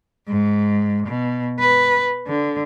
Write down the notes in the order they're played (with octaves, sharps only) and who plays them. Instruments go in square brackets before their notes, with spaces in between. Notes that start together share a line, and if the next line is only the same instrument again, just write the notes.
[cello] G#2
B2
B4
D3